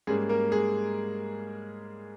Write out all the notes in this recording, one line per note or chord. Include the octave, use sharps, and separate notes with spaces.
G#2 G3 G#3 A#3 C#4 G#4
A#3 A#4
G#3 G#4